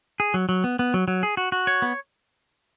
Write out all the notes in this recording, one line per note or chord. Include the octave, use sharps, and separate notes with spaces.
G#4
F#3
F#3
B3
B3
F#3
F#3
G#4
F#4
F#4
C#5
B3